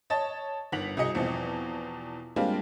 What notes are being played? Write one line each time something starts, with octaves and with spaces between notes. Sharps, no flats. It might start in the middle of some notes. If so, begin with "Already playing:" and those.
C#5 D#5 A5 A6
G1 D#3 F#5 B6 F7 F#7
C2 F#4 G#4 D#5 C#7
E2 B2 F3 C4
G3 G#3 A#3 C4 D4 F4